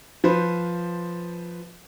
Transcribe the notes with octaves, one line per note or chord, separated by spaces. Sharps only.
F3 B4 C5